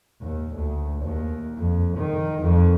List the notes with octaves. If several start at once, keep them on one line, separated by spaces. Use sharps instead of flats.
D#2
D2
D#2
F2
D#3
F2